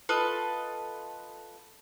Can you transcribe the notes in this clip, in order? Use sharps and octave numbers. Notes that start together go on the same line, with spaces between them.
F4 A4 B4 D#5